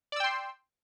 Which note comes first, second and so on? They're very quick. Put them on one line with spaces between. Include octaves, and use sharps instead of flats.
D5 E6 G5 C6